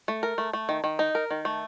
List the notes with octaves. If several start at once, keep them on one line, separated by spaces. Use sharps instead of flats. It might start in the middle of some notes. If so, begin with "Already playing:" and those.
A3
A#4
A3
A3
D#3
D#3
D#4
A#4
D#3
A3